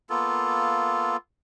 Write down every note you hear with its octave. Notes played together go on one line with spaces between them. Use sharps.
A#3 B3 F4 A4